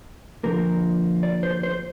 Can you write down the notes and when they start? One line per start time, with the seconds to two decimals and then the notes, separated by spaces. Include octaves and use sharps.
0.43 D3 F3 A#3 A#4
1.23 D5
1.43 C5
1.63 C5